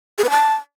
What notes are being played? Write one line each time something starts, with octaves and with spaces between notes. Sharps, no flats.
G#4
B4
A5